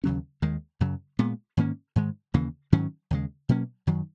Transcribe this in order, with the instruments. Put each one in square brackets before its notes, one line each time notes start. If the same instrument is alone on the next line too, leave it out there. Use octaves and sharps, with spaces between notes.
[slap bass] D#2 C#3 F#3 C#4
D#2 D#3 G#3
F#2 C#3 F#3
A#2 G#3 B3
G#2 D#3 A#3 C#4
G#2 D#3 G#3
D#2 C#3 E3 A#3
G#2 D#3 F#3 C#4
D#2 C#3 G#3
B2 F#3 A#3 C#4
F#2 D#3 F#3